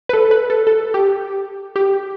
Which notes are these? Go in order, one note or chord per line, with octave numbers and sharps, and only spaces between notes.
B4
A4
B4
A4
A4
G4
G4